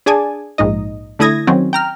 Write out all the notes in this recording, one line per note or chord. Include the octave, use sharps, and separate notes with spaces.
D4 G#4 D5 G#5 A5
A#1 G#2 D#4 D#5
D3 A3 E4 D#6 G#6 A#6
D#3 F#3 C4 C#4
G5 A#5 F6